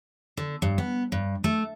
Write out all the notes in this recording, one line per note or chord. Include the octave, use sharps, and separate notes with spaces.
D3
G2
B3
G2
A3